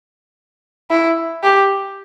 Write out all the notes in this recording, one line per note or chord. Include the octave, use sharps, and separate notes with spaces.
E4
G4